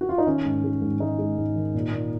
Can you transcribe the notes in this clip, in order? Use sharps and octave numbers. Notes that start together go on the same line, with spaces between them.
F#4
F4
D#4
D#3 C#4
G#2
G#3
G#2
G#3 D#4
G#3
G#2
D#3
A#2
A#2